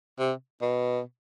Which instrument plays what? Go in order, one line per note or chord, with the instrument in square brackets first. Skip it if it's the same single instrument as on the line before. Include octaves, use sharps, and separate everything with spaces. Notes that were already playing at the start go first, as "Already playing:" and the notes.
[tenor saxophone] C3
B2